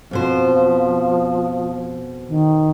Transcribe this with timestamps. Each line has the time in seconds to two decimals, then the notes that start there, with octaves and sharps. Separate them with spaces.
0.11 F2 B2 F3 C5
2.28 D#3